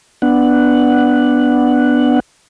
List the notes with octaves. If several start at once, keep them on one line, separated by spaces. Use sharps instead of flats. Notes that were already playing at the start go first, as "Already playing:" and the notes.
B3 D4 F#5